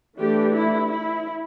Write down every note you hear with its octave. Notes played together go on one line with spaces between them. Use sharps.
E3 A3 D4 G4
E4
E4